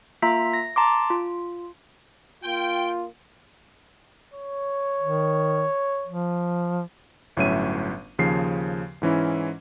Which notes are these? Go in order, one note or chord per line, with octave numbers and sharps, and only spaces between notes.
A#3 F4 E5 A#5 B6
A#6
A5 A#5 C6 D6
F4
A#3 F4 G5
C#5
D#3
F3
G1 A2 F#3 C#4 E5 D#7
D#2 C#3 F3 C7
G#2 E3 C#4 E4